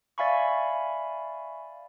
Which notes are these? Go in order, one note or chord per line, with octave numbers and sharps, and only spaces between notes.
D5 E5 F5 G#5 B5 C#6